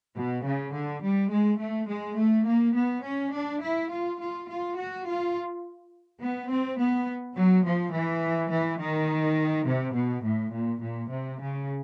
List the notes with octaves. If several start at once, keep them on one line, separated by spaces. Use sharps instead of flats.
B2
C#3
D3
G3
G#3
A3
G#3
A3
A#3
B3
C#4
D4
E4
F4
F4
F4
F#4
F4
B3
C4
B3
F#3
F3
E3
E3
D#3
C3
B2
A2
A#2
A#2
C3
C#3